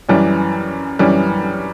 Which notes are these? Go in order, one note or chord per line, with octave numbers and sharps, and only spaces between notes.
F#2 E3 G3 C#4
F#2 E3 G3 C#4